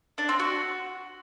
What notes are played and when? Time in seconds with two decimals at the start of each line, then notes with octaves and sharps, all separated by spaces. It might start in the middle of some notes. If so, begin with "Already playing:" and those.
0.18 D4
0.29 C4
0.40 F#4